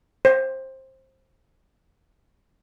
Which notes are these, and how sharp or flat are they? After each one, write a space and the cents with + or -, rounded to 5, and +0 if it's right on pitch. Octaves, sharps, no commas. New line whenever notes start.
C5 +20